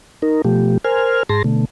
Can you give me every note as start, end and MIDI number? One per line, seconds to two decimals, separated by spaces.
0.22 0.42 63
0.22 0.42 70
0.45 0.78 47
0.45 0.78 53
0.45 0.78 57
0.45 0.78 67
0.84 1.23 70
0.84 1.23 72
0.84 1.23 80
0.84 1.23 89
1.29 1.43 44
1.29 1.43 68
1.29 1.43 81
1.29 1.43 84
1.29 1.43 94
1.44 1.65 47
1.44 1.65 50
1.44 1.65 57